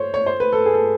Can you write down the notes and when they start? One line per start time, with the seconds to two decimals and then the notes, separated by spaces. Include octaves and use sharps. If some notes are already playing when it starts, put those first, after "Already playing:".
Already playing: C5 C#5
0.14 C#5
0.26 C5
0.40 B4
0.52 A4
0.66 G#4
0.74 A4